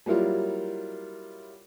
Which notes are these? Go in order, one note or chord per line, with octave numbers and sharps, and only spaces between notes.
F#3 G3 A#3 E4 F4